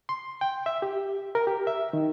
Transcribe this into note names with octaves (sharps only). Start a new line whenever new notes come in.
C6
G5
E5
G4
A#4
G4
E5
D#3